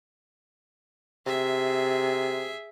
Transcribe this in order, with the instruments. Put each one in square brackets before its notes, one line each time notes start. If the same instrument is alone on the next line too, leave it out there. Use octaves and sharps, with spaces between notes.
[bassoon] C3 [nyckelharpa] G#4 E5